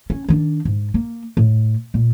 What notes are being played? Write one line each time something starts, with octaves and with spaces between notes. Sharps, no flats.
C#4
D#3 D4
G#2
A#3
A2
A#2